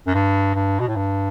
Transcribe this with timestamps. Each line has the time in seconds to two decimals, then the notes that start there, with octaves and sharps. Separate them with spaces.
0.07 F#2
0.14 G2
0.54 G2
0.80 B2
0.88 A2
0.96 G2